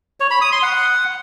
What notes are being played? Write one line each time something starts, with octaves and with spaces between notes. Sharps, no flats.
C#5
B5
D#6
C6
F#5